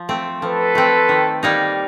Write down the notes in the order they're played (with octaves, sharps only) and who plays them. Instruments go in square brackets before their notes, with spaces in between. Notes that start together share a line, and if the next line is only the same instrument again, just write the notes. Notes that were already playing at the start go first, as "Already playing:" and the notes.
Already playing: [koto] F3
A3 C4
[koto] F3 [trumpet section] A4 B4
[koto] A3 C4
D#3
G3 A#3 D#4